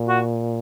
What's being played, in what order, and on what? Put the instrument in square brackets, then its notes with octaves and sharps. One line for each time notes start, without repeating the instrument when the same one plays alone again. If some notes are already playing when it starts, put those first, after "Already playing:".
Already playing: [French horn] A#2
[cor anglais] F#4